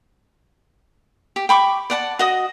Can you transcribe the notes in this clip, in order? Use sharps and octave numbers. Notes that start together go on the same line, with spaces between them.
G4
G5 B5 C#6 D6
D5 F#5 A5
F#4 D#5 D#6